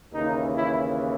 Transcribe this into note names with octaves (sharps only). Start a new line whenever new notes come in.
D#2 C#3 E3 D#4
E4